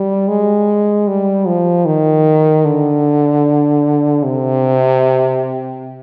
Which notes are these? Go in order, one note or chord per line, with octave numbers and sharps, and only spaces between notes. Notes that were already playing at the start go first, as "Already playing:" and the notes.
Already playing: G3
G#3
G3
F3
D#3
D3
C3